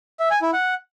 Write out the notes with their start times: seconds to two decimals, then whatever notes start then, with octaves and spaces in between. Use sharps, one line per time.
0.20 E5
0.31 G#5
0.42 E4
0.53 F#5